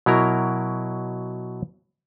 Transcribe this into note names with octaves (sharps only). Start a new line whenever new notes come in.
B2 F#3 E4 A#4 A#5